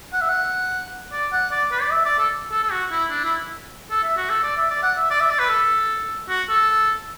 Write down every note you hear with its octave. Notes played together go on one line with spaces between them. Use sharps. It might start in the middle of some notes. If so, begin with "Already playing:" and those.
F#5
E5
F#5
D5
F#5
D5
B4
D5
E5
D5
A4
A4
A4
F#4
E4
D4
E4
A4
E5
F#4
A4
D5
E5
D5
F#5
E5
D5
E5
D5
B4
A4
F#4
A4